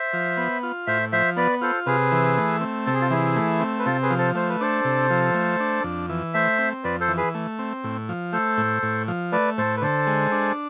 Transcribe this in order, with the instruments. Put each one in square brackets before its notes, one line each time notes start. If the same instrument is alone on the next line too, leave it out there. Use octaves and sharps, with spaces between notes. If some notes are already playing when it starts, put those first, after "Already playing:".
Already playing: [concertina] C5 E5
[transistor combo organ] F3
B3
F4
[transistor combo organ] A2 [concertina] C5 E5
[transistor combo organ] F3 [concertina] C5 E5
[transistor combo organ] B3 [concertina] B4 D5
[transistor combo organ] F4 [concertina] A4 C5
[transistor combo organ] C3 [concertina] G#4 B4
[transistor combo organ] E3
A3
C4
[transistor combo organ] C3 [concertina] A4
[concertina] G#4
F4 A4
[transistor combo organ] E3 [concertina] E4 G#4
[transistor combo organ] A3
C4
[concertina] B4
[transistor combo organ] C3 [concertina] F4 A4
[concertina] G#4 B4
[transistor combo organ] F3
[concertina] A4 C5
[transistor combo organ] A3 [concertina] C5
[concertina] B4
[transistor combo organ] D4 [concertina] A4 C5
[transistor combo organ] C3
F3
A3
D4
F2
E3
[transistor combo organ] A3 [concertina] C5 E5
[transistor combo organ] C4
[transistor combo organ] F2 [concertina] B4 D5
[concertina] A4 C5
[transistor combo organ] E3
[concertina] G#4 B4
[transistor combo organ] A3
C4
A2
F3
[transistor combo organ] A3 [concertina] A4 C5
[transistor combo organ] A2
A2
F3
[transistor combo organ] A3 [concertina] B4 D5
[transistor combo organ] A2 [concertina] A4 C5
[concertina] B4
[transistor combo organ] D3 [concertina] A4 C5
[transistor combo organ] G#3
D4